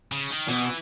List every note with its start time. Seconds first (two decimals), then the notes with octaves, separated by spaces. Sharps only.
0.12 C#3
0.30 D#3
0.48 B2 E3